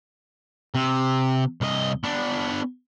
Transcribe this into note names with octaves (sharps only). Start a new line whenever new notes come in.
C3
C2 D#5
B3 D4